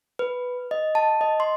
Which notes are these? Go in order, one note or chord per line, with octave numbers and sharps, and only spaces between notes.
B4
D#5
A5
D#5
C6